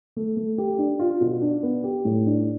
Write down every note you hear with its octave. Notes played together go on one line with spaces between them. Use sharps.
A3
A3
G4
D4
F4
B2
D4
B3
G4
A2
D4